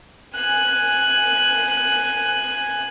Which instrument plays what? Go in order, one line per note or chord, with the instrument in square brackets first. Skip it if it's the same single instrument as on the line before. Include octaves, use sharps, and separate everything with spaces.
[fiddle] G#5 F#6